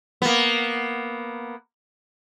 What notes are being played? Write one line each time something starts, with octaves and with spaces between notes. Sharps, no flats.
A#3 B3